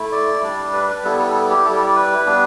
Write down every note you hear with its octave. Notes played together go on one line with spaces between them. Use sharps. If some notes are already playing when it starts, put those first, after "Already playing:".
Already playing: A3 E4
D5
G3 D4
B4
B4
G3 B3 E4 A4
A4
A4
G4
G3 E4 A4
D5
D5
B4
G3 B3 D4